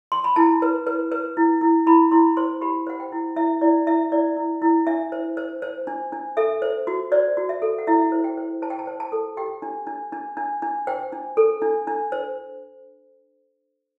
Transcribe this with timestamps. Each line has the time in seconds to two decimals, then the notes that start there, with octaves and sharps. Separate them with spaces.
0.12 C6
0.24 B5
0.36 E4 A5
0.62 B4
0.87 B4
1.12 B4
1.37 E4
1.61 E4
1.86 E4 B5
2.11 E4 C6
2.37 C5 C6
2.61 G4 B5
2.87 C5 F#5
3.00 G5
3.12 E4
3.36 E4 E5
3.61 E4 D5
3.87 E4 E5
4.12 E4 D5
4.37 E4
4.62 E4
4.87 D4 E5
5.12 C5
5.37 C5
5.62 C5
5.87 D4
6.12 D4
6.37 A4 E5
6.62 C5
6.87 F#4
7.12 C5 D5
7.37 F#4
7.49 E5
7.62 A4
7.78 F#5
7.87 E4 E5
8.12 C5
8.24 G5
8.37 C5
8.62 C5 A5
8.70 G5
8.79 A5
8.87 C5
9.00 A5
9.12 A4
9.37 G4 G5
9.62 D4
9.87 D4
10.12 D4
10.37 D4
10.62 D4
10.87 C5 G5
11.12 D4
11.37 A4
11.62 D4
11.87 D4
12.12 C5